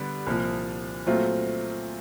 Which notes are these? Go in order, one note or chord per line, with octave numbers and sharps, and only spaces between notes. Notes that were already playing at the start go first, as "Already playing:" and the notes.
Already playing: D3 G3 B3 D4
C2 A#2 F3
A#2 F#3 A3 C4 F4